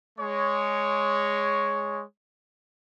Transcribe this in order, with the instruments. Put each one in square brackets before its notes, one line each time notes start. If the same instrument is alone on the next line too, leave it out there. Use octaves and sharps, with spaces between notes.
[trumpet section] G#3 C#5